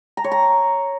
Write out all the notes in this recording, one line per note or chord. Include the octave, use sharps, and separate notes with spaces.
A#5
C#5
A#5